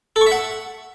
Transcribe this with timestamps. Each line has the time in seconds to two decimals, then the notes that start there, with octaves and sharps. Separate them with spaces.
0.16 A4
0.21 C#6
0.26 E5
0.32 F#5